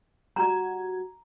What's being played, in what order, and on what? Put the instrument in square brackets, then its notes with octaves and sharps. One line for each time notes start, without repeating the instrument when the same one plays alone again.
[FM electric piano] G3 F#4 G#6 [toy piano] A#5